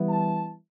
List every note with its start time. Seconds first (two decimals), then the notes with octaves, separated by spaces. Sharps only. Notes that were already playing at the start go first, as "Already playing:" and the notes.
Already playing: E3 G3 B3 E4
0.10 A5